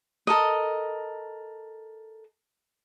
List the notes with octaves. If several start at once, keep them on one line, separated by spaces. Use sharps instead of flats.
A4 A#4 D#5